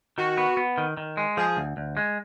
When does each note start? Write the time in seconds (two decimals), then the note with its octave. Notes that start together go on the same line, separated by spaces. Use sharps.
0.17 D#3 F#4
0.38 B3
0.57 B3
0.78 D#3
0.97 D#3
1.17 G#3
1.37 F3 G#4
1.57 D2
1.77 D2
1.97 G#3